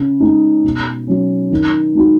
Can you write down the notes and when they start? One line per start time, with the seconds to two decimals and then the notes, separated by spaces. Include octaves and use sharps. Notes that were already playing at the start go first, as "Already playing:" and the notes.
Already playing: C#3
0.20 G#3 D#4
0.64 B2
1.07 F#3 C#4
1.51 D#3
1.95 G#3 D#4 F#4